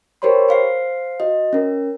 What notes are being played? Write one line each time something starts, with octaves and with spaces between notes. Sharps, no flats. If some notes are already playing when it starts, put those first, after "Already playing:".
G4 A#4 C5 C#5 B5 C6
C5 F5 C7
F#4 D#5
C#4 A#4